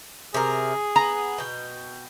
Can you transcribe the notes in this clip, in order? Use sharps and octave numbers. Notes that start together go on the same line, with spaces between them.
C3 G#4 A#4
B3 A#5
B2 G5